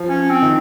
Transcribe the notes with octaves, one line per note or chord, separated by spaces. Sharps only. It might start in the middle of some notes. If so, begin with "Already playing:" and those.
Already playing: F3
C#4
C4
D#3